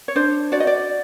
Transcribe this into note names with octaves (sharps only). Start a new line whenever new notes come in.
C#5
D4 C5
F#4 D5
D#5
D5